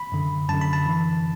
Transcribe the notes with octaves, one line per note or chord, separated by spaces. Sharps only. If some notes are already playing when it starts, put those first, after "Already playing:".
Already playing: B5
F#2 D3
F#2 D3 A5
B5
A5
F#2 E3